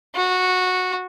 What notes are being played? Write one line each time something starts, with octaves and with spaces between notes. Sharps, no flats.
F#4